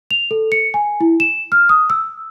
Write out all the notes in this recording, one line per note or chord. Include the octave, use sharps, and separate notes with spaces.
F7
A4
C#7
G#5
E4
E7
F6
D#6
E6